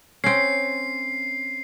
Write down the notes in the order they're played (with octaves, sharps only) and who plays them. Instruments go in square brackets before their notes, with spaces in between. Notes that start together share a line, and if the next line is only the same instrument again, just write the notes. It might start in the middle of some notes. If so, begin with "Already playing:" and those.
[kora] C4 C#4 [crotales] C7